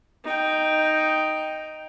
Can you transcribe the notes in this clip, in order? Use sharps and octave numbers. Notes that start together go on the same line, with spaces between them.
D#4 G5